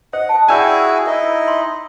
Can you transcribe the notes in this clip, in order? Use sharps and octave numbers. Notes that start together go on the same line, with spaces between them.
C5 D#5 F#5
A5
E4 F#4 G#4 D5 G5 G#5 E6 G6
D#4 E4 A#4 D#5
C6